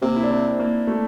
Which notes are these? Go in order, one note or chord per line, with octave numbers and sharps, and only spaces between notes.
C3 A#3
E4
D4
C4
A#3
A3